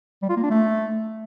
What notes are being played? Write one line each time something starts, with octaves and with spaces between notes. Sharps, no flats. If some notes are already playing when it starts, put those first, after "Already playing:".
G3
F4
A#3
D4
A3